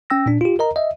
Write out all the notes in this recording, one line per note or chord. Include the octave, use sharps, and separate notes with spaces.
C#4 G5 E6 A#6
A#2 D4
F4 G4
A#4 D#5 A#5
D#5 E5